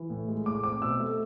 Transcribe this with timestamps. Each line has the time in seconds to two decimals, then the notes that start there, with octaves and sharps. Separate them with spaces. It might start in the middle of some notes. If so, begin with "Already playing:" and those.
Already playing: E3
0.10 A2
0.28 G#3
0.46 A2 D6
0.63 C4 D6
0.82 B2 E6
1.00 A3